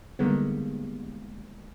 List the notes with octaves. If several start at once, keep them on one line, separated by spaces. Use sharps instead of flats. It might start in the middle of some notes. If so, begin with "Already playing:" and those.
D3 D#3 G3 G#3 A#3 B3